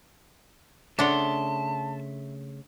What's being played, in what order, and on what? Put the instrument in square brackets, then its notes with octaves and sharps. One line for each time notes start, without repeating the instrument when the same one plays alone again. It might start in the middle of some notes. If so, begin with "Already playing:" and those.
[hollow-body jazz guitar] C#3 A3 [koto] D4 F#5 [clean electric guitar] E5 C6 [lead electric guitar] A5